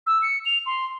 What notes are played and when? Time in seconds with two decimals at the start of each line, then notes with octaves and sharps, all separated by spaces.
0.07 E6
0.22 C#7
0.46 F7
0.66 C6